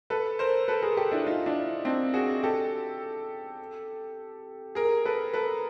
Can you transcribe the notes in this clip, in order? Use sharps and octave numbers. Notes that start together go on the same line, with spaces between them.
A4 B4
A#4 C5
A4 B4
G#4 A#4
G4 A4
D4 E4
D#4 F4
D4 E4
C4 D4
F#4 G#4
G4 A4
G#4 A#4
A4 B4
A4 B4